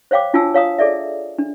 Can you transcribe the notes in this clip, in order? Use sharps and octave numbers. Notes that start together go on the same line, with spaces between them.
C5 C#5 F5 G5 D6
D4 F4 F#4 G#5 A5 E6
C#5 F5 A#5 D#6
G#4 A4 D5 E5
D4